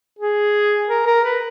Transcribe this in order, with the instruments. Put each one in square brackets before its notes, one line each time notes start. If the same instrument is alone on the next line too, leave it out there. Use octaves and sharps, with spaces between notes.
[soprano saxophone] G#4
A#4
A#4
B4